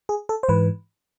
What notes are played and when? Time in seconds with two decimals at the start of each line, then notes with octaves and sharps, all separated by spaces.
0.09 G#4
0.29 A4
0.43 C5
0.49 G#2 E3 B4